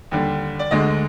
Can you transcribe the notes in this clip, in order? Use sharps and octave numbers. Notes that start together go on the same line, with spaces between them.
D#2 D3 G3
D5
D2 D3 G#3 D#5